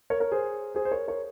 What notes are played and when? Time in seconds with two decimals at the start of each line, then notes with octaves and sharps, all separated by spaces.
0.10 A#4 C#5
0.20 A#4 C#5
0.32 G#4 C5
0.75 G#4 C5
0.85 C5
0.91 A#4 C#5
1.08 A#4 C#5